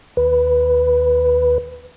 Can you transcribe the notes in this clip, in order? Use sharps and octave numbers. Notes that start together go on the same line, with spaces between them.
D#2 B4